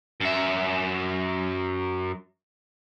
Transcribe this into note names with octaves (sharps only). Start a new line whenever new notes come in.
F#2 E5